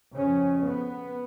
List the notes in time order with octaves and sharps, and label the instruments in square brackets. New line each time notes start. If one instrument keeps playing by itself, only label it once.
[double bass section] F2 C#3 C#4
B3